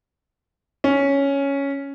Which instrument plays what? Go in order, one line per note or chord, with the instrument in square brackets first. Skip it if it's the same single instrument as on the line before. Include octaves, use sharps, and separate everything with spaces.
[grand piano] C#4